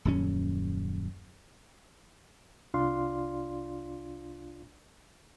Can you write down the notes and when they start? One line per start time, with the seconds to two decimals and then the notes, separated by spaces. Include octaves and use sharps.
0.05 D#1 F#2 C#4
2.74 C2 D4 F4 D5 F5 C6